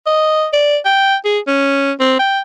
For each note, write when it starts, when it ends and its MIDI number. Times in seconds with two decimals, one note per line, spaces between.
0.06 0.47 75
0.53 0.77 74
0.85 1.15 79
1.25 1.39 68
1.47 1.92 61
2.00 2.15 60
2.19 2.40 79